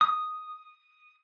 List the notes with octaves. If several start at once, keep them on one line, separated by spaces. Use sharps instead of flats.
D#6